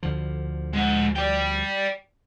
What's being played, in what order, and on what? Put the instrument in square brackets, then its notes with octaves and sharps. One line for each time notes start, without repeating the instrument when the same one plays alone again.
[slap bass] D2 D3 F3
[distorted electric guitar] G#3 F#5
D5 G5